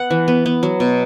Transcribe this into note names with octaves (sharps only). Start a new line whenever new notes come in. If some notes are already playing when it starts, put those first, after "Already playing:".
Already playing: B3 F#5
E3
B3
B3
F#3
B2